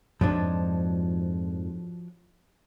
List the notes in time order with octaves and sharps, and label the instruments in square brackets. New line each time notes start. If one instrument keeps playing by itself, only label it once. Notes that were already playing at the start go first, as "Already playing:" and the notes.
[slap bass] F2 G#2 [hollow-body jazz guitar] F3 F#3 D4